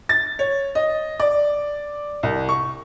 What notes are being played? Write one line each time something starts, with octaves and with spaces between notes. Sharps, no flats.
A6
C#5
D#5
D5
C2
C#6